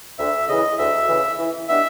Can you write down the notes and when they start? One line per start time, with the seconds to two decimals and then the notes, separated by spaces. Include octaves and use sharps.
0.19 D2 E5
0.48 C#3 E3 D#5
0.78 D2 E5
1.09 C#3 E3
1.39 E3
1.68 G#3 B3 D4 G4 E5